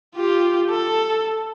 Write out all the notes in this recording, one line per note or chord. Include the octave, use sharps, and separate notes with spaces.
F4 G4
A4